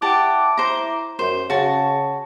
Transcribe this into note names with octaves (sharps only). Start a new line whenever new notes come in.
E4 G4 F#5 A5 D6
C5 A#5
F#2 C5
C#3 F#4 A5